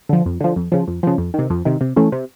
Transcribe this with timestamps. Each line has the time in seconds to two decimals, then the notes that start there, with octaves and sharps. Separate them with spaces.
0.09 D3 F3
0.26 F2
0.41 D3 F3
0.56 F2
0.72 C#3 F3
0.88 F2
1.03 C#3 F3
1.18 F2
1.34 C3 D#3
1.50 F2
1.65 C3 D#3
1.81 C3
1.96 E3 A3 C#4
2.12 C3